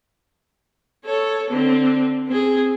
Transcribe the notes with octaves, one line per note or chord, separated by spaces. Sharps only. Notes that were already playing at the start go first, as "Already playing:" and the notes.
A4 C#5
D3 C4
C4 G#4